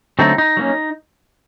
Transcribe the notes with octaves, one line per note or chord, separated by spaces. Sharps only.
D3 F#3 A3 C4 D#4
D#4
F#3 A#3 C#4